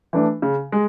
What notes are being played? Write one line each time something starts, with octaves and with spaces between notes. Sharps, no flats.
E3 A3 D4
C#3
G#3